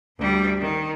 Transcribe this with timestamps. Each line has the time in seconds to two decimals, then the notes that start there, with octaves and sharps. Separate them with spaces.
0.18 D2 G3
0.61 D#3